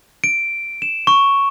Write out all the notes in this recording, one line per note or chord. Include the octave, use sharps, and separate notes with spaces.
D7
E7
C#6